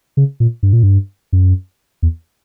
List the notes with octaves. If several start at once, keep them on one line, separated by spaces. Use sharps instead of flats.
C#3
A#2
G2
A#2
G2
F#2
E2